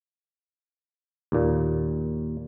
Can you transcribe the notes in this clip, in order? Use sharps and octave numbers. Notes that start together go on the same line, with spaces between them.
D#2 A#2